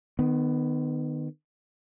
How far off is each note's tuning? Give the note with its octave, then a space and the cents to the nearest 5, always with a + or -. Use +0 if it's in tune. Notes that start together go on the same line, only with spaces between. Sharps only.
D#3 -30 B3 +15